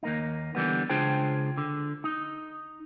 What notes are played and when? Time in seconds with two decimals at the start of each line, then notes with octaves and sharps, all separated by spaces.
0.03 D#2 A#3 D#4
0.55 D3 E3 G3 B3
0.90 C#2 D4 F4 G#4 C5 G5
1.57 D3
2.04 D#4